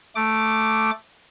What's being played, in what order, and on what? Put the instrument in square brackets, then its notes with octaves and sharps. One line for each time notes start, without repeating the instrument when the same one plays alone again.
[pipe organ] A3 D6